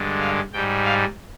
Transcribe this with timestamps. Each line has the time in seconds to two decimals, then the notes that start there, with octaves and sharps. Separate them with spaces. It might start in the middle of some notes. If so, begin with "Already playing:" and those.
Already playing: G2 D3 G#3
0.21 F5
0.53 G#2 G3 G5
0.85 F5